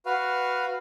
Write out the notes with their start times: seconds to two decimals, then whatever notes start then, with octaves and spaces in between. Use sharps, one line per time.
0.06 F#4 B4 F5